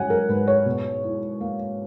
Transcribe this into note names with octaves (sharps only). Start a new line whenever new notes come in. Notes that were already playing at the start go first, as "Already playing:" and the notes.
Already playing: G#2 F#3 C#4 F#5 G#5
A#4
G#2 B4
C#5
B2
E4
A#3